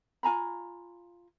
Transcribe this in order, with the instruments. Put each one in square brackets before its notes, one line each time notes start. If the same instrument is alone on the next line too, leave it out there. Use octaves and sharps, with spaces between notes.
[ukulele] F4 G#5 A#5 B5